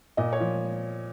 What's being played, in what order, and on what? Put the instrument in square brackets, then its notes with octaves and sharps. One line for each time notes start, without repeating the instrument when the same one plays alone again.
[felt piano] A#2 D#5
C#5
F3